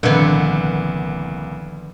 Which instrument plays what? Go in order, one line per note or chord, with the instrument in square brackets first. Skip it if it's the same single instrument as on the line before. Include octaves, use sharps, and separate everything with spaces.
[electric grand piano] C2 A#3 B4 [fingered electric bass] A#2 [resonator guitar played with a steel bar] D3 B3 [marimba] D#3 F3